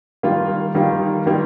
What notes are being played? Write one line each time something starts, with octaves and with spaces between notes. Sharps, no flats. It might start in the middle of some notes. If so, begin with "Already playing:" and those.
D#3 G3 A#3 F4
D#3 G3 A#3 F4
D#3 G3 A#3 F4